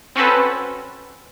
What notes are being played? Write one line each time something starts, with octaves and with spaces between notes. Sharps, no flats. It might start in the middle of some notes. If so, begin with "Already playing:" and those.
C4 C#4 F#4 A4 B4